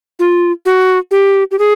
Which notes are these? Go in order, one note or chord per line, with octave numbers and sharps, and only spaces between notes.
F4
F#4
G4
G4
G#4